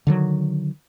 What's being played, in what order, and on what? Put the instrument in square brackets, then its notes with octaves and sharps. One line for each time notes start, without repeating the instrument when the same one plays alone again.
[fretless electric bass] D3 D#3 F#3